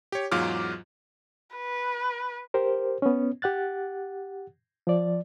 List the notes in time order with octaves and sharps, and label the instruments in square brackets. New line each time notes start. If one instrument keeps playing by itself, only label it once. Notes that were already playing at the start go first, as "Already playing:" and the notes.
[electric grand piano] G4 C#5
E2 G#2 F#3 F4 D6 F6
[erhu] B4
[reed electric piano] G4 A#4 C5
B3 C#4
G4 F#5 F#6 A6
F3 D5